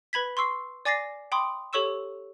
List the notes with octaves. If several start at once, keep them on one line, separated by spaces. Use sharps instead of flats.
B4 B5 G#6 B6
C6 C#6 E6 C7
D5 G#5 D6 A6 A#6 C7
G5 B5 C6 D6 D#6
G4 A4 C#5 C#6 E6 E7